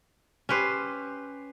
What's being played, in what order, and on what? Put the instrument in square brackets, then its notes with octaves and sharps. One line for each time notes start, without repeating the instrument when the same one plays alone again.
[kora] C#4 G4 B4 C5